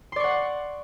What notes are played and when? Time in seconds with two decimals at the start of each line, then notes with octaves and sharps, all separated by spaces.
0.12 C6
0.16 D5
0.20 C#6
0.24 F#5